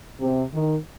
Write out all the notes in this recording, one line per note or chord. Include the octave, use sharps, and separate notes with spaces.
C3
D#3